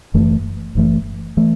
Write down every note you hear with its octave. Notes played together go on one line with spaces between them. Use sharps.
F#1 F#2 E3 A3
F#1 F#2 E3 A3
E3 A3